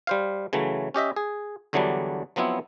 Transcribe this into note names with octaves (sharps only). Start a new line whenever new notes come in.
G3 C5 F5
C#3 E3 F#3 A3
C#4 G4 D#5 E5
G#4
E2 D3 E3 F#3 G3 D4
F3 F#3 B3 C4 E4